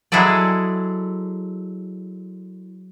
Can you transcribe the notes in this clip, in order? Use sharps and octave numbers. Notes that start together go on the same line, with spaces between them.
F#3 G#3 E4 G#4 A4 D5